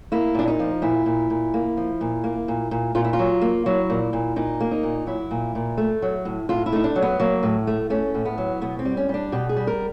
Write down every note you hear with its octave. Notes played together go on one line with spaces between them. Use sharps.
A#3 E4
A#2 D4
D#4
F3
A#2 E4
A#2
A#2
A#3
F3
A#2
A#3
A#2
A#2
A#2 F4
E4
F4
F#3
A#3
F#3 E4
A#2
A#2
A#2 D#4
A#3
D#4
A#2
F#3 E4
A#2
A#2
A3
F#3
A2
A2 F4
E4
A3 D#4
D4
F#3
B3
F#3 A#3
A2
A3
A3 C#4
A2
B3
F#3
B2 B3
C4
G3
C#4
G3 D4
B2 G4
G#4
G3
A#4